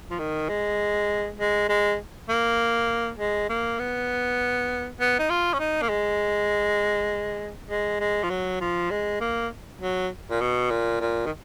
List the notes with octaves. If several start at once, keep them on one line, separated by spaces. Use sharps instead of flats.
F3
D#3
G#3
G#3
G#3
A#3
G#3
A#3
B3
B3
D#4
F4
C#4
D#4
A#3
G#3
G#3
G#3
F3
F#3
F3
G#3
A#3
F#3
A#2
B2
A#2
A#2
D#3